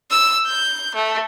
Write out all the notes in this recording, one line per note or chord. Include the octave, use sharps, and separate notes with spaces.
E6
G6
A3